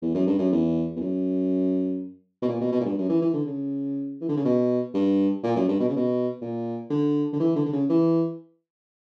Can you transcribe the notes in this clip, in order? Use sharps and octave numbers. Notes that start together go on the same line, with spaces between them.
E2
F#2
G2
F#2
E2
E2
F#2
B2
A#2
B2
B2
A#2
G2
F#2
E3
E3
D3
C#3
E3
D3
C#3
B2
G2
A#2
F#2
G2
B2
C#3
B2
A#2
D3
D3
E3
D3
D3
C#3
E3